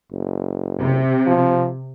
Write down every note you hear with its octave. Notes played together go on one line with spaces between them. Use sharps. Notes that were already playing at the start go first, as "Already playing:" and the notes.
F#1
C3
F3